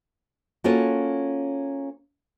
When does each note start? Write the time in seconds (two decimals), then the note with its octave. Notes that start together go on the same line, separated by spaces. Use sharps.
0.64 A#3 C#4 F4 F#4 A4 C#5